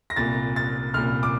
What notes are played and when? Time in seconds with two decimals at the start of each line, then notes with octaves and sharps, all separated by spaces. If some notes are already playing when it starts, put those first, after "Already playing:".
0.10 A#6
0.16 C2 A#2 A6
0.56 A6
0.94 C2 A#2 F6
1.23 D6